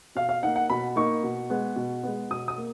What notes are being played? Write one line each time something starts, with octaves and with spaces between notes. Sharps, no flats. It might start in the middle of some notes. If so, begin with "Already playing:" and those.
B2 F5
F5
A#3 D#4 F#5
F#5
B2 B5
A#3 D#4 C#6
B2
G#3 B3
B2
G#3 B3
B2 D#6
D#6
A#3